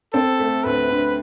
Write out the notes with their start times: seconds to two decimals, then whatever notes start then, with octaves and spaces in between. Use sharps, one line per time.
0.13 C4 A4
0.39 A3
0.64 D2 B4
0.90 D3